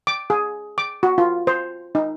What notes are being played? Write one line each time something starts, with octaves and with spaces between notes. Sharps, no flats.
D6
G#4
D6
F#4
F4
C5
D#4